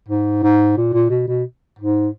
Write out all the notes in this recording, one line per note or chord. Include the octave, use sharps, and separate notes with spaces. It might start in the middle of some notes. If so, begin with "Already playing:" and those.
G#2
G#2
A#2
A#2
B2
B2
G#2